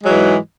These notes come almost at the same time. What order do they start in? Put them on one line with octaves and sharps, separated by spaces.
G#3 F#3 E3 G#2